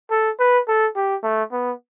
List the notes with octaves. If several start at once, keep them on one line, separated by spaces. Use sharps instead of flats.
A4
B4
A4
G4
A3
B3